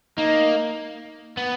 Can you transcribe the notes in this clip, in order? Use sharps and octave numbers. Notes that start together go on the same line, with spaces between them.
A#3 D#4
B3